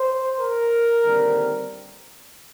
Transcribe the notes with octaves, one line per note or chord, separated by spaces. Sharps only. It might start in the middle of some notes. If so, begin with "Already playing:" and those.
Already playing: C5
A#4
D#2 D3 G3 C4